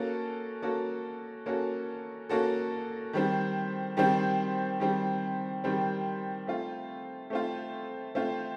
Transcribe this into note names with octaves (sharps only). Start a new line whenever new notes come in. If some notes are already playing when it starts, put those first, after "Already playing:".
Already playing: A#3 C#4 F#4 A4
A#3 C#4 F#4 A4
A#3 C#4 F#4 A4
A#3 C#4 F#4 A4
D#3 G3 C4
D#3 G3 C4
D#3 G3 C4
D#3 G3 C4
A3 C4 F4
A3 C4 F4
A3 C4 F4